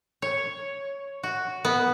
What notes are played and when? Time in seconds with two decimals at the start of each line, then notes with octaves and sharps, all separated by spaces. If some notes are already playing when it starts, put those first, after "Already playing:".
0.22 C#5
1.23 F#4
1.65 B3